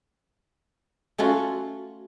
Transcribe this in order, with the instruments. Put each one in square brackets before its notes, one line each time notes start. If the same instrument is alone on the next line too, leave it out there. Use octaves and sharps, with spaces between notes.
[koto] A3 C#4 F4 F#4